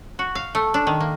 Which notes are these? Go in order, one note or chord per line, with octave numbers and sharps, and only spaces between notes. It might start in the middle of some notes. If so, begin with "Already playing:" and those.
F#4
F5
A3
D4
D#3
A#3